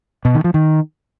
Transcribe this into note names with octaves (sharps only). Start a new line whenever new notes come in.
B2
D#3
F3
D#3